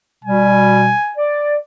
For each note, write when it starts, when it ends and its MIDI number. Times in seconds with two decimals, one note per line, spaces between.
0.25 0.94 47
0.25 0.94 55
0.25 1.16 80
1.18 1.57 74